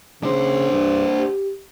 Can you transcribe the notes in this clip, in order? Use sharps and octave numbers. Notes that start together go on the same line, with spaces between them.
C#3 D4 C5
G2
G4